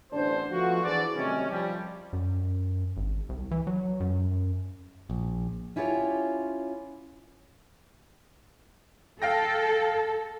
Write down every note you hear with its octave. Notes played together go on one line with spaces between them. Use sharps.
A1 E2 D3 D4 C5
F3 A3 B3 F4 F#4
E3 D4 E4 G#4 C5 D5
C3 D#3 F#3 G3 A3 C#4
F3 G3
F#2
G#1
C2
E3
F#3
F#2
A#1
C#4 E4 F4 G4 C5 C#5
A4 F5 G5 A#6